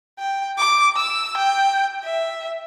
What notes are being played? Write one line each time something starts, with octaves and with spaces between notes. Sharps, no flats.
G5
D6
E6
G5
E5